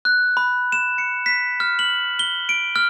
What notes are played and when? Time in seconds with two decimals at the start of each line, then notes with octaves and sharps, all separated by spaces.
0.05 F#6
0.37 B5
0.72 E7
0.98 C#7
1.26 B6
1.60 F6
1.79 F#7
2.19 G7
2.49 D7
2.76 F6